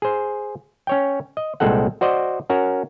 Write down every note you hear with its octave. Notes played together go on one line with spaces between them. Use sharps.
G#4 C5
C#4 C#5 G5
D#5
C2 A#2 G#3 C4 A4 F#5
F#4 C5 D5 D#5
C#4 F#4 A#4